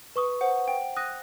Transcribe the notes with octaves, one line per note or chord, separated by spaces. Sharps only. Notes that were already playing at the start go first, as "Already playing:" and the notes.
B4 C#6 D#6
C5 F#5
G5
D#6 F#6 A#6 D#7